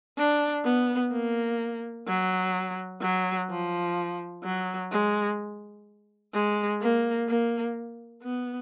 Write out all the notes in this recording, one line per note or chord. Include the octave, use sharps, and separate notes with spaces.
D4
B3
A#3
F#3
F#3
F3
F#3
G#3
G#3
A#3
A#3
B3